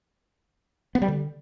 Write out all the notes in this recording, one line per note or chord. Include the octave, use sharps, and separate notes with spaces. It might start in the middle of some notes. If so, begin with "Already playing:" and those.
B3
G3
D3